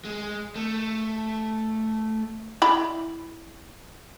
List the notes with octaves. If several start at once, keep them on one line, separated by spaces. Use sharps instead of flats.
G#3
A3
E4 D5 B5